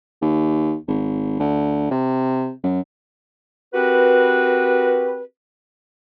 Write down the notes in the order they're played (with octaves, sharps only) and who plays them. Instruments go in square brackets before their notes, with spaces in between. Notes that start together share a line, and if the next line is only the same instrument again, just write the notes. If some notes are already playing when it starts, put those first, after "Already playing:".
[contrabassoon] D#2
G#1
D2
C3
F#2
[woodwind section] C4 F#4 G4 A#4 B4